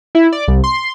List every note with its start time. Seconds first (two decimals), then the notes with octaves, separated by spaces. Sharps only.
0.15 E4
0.32 D5
0.48 C2
0.64 C6